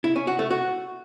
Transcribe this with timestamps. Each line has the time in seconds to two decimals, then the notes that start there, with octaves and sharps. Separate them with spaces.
0.04 E4
0.16 C#4
0.27 F#4
0.39 A3
0.50 F#4